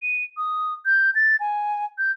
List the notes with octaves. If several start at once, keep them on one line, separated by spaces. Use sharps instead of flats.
D#7
D#6
G6
A6
G#5
G6